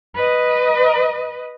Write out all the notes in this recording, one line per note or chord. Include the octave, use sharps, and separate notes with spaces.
B4 D#5